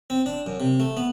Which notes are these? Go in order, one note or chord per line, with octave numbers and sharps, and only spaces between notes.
C4
D4
F#2
C3
A3
B3